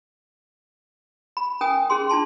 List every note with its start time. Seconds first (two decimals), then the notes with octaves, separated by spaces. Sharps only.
1.37 B5
1.61 C#4 A#4 G5 G#5 D#6
1.90 C#4 G#4 C6
2.09 D4 F4 A5 C6